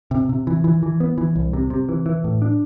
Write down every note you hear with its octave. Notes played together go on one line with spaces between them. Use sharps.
C3
C3
E3
E3
E3
B3
E3
C2
C3
C3
E3
E3
A2
D4